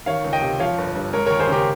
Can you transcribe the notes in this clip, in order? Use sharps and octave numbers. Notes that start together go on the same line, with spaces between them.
D#3 C#5 F5
C#2
D#5 G5
C3
F3 C#5 F5
G1
G2
G#3 A#4 C#5
D#2 A#4 C#5
G#4 C5
C#3 G4 A#4